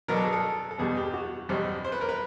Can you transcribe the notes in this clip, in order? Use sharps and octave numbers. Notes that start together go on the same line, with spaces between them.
B2 F#3 B3 D4 A#4
A4
G#4
A4
A4
E2 B2 G3 B3 G#4
G4
F#4
E2 B2 G3 C4
C5
B4
A#4
B4